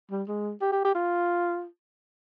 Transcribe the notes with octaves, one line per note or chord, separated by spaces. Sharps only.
G3
G#3
G4
G4
G4
F4